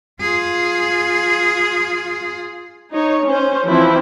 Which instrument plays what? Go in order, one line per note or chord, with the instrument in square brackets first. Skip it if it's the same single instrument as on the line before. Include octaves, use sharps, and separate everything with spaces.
[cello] F4 G#4
[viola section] D#4 C#5
C#4 C5
E3 F3 C4 E4 C5